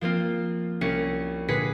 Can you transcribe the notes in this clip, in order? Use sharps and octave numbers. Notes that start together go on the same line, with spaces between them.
F3 A#3 C4 F4
C2 C#4 C#7
A#2 D3 G#4 B4 B6 C#7